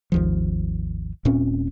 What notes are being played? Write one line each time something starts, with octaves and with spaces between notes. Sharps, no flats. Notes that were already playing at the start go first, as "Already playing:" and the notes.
G#1 D#2 F3
D#1 A#2 C4 C#4